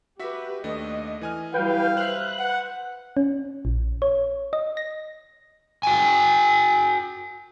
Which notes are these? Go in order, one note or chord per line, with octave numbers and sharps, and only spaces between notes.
F#4 G4 B4 E5 B6
D#2 A3 D4 D#5
E3 G#5 F6
F#3 G3 E4 B4 F5 G5
B4 C5 E5 F#6
F#5
C#4
A#1
C#5
D#5
A#6
F#4 G5 G#5